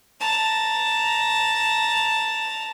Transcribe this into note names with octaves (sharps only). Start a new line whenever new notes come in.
A5 A#5